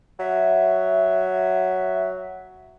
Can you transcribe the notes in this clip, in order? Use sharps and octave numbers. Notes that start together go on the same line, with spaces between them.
F#3 E5